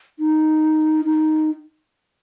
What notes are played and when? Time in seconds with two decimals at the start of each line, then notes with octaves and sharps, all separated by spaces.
0.19 D#4
1.05 D#4